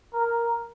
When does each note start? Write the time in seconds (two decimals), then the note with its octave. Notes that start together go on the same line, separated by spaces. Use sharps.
0.14 A#4